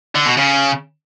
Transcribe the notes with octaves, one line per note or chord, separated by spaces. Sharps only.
D3
B2
C#3